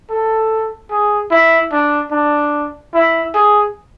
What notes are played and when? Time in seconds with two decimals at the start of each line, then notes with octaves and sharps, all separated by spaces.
0.10 A4
0.90 G#4
1.31 E4
1.72 D4
2.12 D4
2.94 E4
3.34 G#4